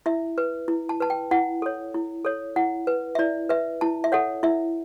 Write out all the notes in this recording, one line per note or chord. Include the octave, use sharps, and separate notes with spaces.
E4 E5
B4
E4
A5
B4 A5
G5
E4 F#5
A4 C#5
E4
A4 C#5
E4 F#5
B4
E5
E4 D5
B4 E5
E4 A5
E5
A4 C#5 F#5
E4 E5